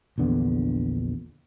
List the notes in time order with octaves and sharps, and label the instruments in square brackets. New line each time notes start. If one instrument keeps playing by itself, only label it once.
[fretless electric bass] A#1 E2 D3 B3